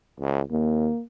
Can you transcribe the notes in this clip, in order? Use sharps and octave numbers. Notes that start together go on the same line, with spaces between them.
C#2
D#2 A#3